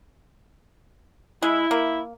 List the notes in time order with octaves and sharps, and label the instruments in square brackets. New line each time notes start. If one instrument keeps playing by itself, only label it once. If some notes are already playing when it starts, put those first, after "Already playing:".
[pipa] G#3 [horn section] E4
[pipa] A#3